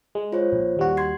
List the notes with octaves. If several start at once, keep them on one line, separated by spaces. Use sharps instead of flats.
G#3
F4 C5 C#5
A#1 A#2
D#2 G3 F#4
C6 G#6 C7